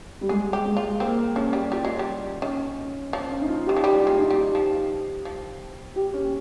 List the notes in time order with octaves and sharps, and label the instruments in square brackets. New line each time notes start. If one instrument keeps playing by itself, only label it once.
[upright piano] G3
[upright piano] G#3 [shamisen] G#4
[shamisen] G4
[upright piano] G#3
[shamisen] F4
[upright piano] A#3 [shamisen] C4
[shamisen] F3 [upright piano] C#4
[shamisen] G3
[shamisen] G3 [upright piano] F4
[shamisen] G#3
G3
[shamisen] D#3 [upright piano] C#4
[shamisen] F3 [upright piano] C#4
[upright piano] C#4
D#4
F4
G4
[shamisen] D#3
F3
[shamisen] G3 [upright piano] G4
[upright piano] F4
[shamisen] G#3
[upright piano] D#4
[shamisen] G3
[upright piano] G4
[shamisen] F3
F3
[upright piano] G4
C#4